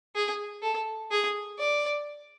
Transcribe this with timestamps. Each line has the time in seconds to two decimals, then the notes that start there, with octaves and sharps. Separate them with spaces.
0.15 G#4
0.62 A4
1.11 G#4
1.59 D5